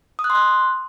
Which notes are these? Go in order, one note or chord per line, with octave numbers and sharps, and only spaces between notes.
D#6
F#6
C6
F#6